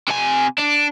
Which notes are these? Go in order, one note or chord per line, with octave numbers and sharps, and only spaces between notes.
C3 G#5
D4